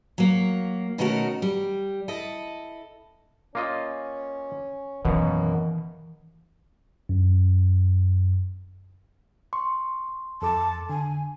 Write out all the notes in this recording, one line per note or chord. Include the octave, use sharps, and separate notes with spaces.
F#3 A#3
B2 D#3 A3 C#4 F#4 A#4
G3
E4 A4 D#5
A#3 C#4 F4 D#5
F#2 B2 D#3 E3 A#3
F#2
C6 C#6
F2 A4 A5 D6
D3 G#5